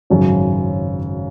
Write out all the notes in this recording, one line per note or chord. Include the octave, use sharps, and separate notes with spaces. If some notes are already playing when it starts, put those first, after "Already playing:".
G#1 F#2 C#3 F#3 C#4